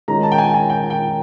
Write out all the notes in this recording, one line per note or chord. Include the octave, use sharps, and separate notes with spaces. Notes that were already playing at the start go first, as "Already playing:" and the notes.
D#3 G#3 C#4 F4 A#5
A5
G5
G#5
G#5
G5
G5